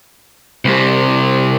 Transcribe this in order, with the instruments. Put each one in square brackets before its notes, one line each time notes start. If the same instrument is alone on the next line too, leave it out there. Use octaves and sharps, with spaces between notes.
[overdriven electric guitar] C2 C3